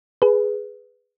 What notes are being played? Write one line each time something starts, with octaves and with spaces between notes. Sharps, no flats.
G#4 B4